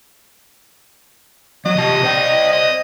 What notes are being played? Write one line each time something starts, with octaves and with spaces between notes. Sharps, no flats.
F#3 D#5
C3 G4 A5
C5 D5 G5
D#5